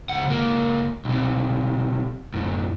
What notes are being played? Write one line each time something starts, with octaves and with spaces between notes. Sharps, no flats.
C#2 F#5
C#2 A#3
B1 C3
F#2 A2